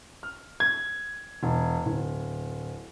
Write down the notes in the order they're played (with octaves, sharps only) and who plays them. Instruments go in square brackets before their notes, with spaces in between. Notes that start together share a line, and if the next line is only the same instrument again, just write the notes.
[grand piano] F6
G#6
E1
D1